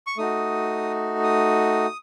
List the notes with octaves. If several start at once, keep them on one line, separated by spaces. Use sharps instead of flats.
C#6
A3 D#4 F#4 D#6
D#6